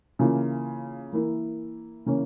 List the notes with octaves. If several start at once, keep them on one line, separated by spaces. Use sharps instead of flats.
C#3 E3 A#3 F4
E3 A#3 E4 A#4
C#3 E3 A#3 C#4